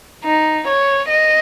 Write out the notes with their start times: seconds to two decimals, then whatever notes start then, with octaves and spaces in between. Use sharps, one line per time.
0.24 D#4
0.67 C#5
1.10 D#5